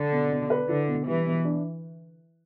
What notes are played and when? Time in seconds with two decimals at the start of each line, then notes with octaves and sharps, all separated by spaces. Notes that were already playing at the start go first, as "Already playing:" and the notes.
Already playing: D3
0.12 B2
0.31 B2
0.50 B4
0.68 D3 E4
0.88 B2
1.06 E3 G3
1.26 B2
1.45 D4